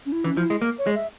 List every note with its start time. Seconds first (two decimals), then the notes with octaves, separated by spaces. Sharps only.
0.06 C#4
0.12 E4
0.24 E3 C#4
0.37 F3 E4
0.50 G#3
0.62 A#3
0.79 C#5
0.87 G#3
0.95 E5